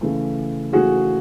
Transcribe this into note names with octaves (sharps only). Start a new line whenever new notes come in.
C#3 E3 A3
C#3 E3 A3 F#4 G#4